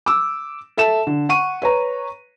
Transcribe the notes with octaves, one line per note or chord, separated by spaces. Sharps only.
D6 E6
A4 E5 A5 E7
D3
F#5 C#6 D#7
B4 C#5 A#5